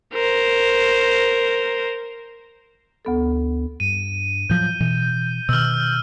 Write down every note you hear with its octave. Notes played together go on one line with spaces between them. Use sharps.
A#4 C5
D2 B3 A4
G2 D#7
A2 F3 F#3 G6
B2 E3
B2 D#3 E6 F6